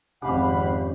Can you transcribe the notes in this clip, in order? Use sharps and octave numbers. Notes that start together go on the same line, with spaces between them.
G#1 F2 C#4 G4 F5 F#5 B5